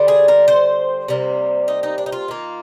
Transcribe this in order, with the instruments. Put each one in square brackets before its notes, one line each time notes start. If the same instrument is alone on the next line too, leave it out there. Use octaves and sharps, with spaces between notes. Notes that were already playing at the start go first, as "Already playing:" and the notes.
Already playing: [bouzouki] D3 G3 C4
G#4
A#4
C5
C3 G3 A#3
D#4
D#4
D4
D#4
F4
D#3 A#3